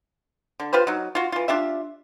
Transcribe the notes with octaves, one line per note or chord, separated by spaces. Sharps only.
D3
F4 G4 B4 C5
F#3 D#4
F4 F#4
E3 F4
D4 F4 G4 E5